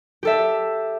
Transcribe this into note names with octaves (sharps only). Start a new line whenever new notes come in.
G4 A4 E5